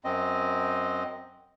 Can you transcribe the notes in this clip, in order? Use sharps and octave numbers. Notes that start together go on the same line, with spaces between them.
F#2 C4 D#5